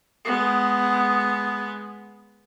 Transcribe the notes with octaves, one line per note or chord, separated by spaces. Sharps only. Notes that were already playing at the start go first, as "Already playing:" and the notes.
G#3 B3